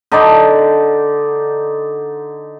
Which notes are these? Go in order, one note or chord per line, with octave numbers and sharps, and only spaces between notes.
D3 D#4 D5